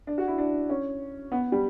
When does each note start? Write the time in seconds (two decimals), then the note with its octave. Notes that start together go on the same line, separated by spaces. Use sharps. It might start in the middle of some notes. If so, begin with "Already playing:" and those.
0.07 D4
0.18 F#4
0.28 E4
0.38 D4
0.69 C#4
1.32 B3
1.52 G3